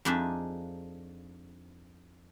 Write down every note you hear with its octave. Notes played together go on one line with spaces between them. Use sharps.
F2 F3 D4 D#4 G#4 E5